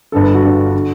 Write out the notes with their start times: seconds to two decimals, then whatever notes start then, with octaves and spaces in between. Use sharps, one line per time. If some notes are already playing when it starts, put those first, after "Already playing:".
0.12 G1 G2 D3 A4
0.23 B4
0.34 F#4 A4
0.43 G1 G2 D3
0.73 D3